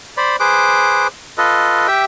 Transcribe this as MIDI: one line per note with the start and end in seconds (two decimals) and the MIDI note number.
0.17 0.36 72
0.17 0.36 74
0.17 0.36 83
0.40 1.07 68
0.40 1.07 71
0.40 1.07 72
0.40 1.07 86
1.38 1.87 65
1.38 1.87 69
1.38 1.87 71
1.38 1.87 75
1.87 2.05 67
1.87 2.05 76
1.87 2.05 79